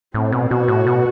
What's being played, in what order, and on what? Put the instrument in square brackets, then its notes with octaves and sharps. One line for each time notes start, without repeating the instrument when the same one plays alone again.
[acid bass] A2 [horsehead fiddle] C4
[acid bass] B2
[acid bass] B2 [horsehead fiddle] F#4
[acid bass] A2
B2